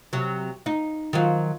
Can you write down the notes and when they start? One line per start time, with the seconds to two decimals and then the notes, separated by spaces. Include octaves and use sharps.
0.13 C3 F#3
0.66 D#4
1.13 D#3 F3 F#3